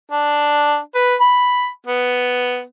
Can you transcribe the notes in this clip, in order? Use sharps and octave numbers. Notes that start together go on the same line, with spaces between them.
D4
B4
B5
B3